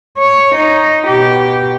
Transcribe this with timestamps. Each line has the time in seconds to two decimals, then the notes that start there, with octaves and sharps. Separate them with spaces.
0.19 C#5
0.55 D#4
1.07 B2 G4